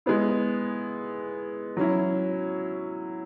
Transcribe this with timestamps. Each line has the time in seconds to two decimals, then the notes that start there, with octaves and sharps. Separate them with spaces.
0.06 G#3 B3 E4
1.77 F#3 C#4 E4